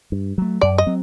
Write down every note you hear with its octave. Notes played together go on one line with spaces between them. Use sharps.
G2
F#3 A3
F#2 D5
D#5
F#3 C4